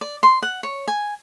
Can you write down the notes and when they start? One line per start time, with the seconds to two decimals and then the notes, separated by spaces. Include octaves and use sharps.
0.01 D5
0.23 C6
0.42 F#5
0.63 C#5
0.88 G#5